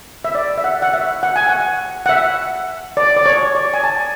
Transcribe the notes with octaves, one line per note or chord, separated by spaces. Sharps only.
E5
D5
E5
F#5
F#5
E5
F#5
G#5
F#5
F#5
E5
D5
D5
C#5
D5
G#5
A5